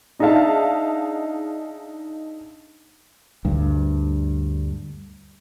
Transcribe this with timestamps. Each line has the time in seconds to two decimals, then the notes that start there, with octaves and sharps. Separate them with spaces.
0.19 D4 D#4 G#4 E5 F5 A5
3.45 D2 G2